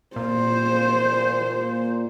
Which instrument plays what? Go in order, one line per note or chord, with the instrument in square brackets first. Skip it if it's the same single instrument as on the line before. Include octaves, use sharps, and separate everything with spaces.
[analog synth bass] A#2 [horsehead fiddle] C5